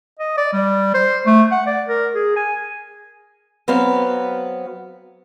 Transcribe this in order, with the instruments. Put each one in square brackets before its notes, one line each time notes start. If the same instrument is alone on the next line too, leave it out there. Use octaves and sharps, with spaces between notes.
[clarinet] D#5
D5
G3
C5
A3
F#5
D5
A#4
G#4
G#5
[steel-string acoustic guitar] F#3 B3 C4 F5